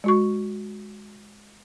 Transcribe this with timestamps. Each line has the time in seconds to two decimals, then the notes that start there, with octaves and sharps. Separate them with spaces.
0.04 G#3 F#4 C#6